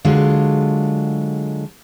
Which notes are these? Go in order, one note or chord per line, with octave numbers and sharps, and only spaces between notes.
D3 F#3 G#3 F4